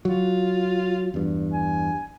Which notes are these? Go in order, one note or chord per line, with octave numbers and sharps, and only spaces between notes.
F#3 F4
E2 G2
G#5